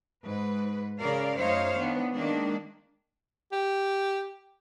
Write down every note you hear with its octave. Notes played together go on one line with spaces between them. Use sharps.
G#2 B4
C#3 A#4 D5 F5
F#2 A3 D#4 C5 C#5 F5
D#3 B3 D4
D#3 G#3 A#3 D4
G4